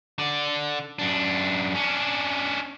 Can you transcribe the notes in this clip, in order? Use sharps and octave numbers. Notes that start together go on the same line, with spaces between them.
D3 D5
F#2 D4
C#4 D4